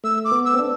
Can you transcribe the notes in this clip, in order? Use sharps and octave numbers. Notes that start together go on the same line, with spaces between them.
A3 E6
D6
B3
E6
C4
D4